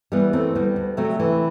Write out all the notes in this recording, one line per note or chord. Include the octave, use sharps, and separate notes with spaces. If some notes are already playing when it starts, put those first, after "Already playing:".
E3 G3 B3
F#2 A3 C4
D2 G3 B3
D2
C3 F#3 A3
E3